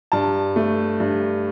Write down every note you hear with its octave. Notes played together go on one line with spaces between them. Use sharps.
G2 A5
A3
G2